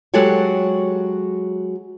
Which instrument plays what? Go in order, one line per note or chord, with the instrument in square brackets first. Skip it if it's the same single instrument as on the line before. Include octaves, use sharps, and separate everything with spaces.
[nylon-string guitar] F#3 G#3 F#4 G4 A4 C#5